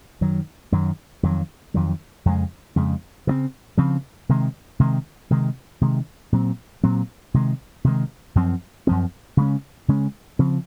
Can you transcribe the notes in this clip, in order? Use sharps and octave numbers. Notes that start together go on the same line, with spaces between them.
F#2 D#3 F#3
F#2 D#3 F#3
F2 D#3 F#3
F2 D#3 F#3
F2 C#3 G#3
F2 C#3 G#3
C#3 F3 C4
C#3 F3 C4
C3 D#3 G#3
C3 D#3 G#3
C3 D#3 G#3
C3 D#3 G#3
A#2 F#3 C4
A#2 F#3 C4
C3 D#3 G#3
C3 D#3 G#3
F#2 F3 C4
F#2 F3 C4
C#3 G#3 C#4
C#3 G#3 C#4
C#3 F3 C4